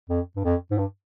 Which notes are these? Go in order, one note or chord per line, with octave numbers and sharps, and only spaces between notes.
F2
G2
F2
G#2
G2